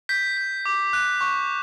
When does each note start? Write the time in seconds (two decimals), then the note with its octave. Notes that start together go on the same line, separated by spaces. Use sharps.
0.09 G6 B6
0.37 G6
0.66 D6
0.93 F#6
1.21 C#6